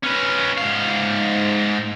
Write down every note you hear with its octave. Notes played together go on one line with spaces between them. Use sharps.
C#4 B4
G#2 F5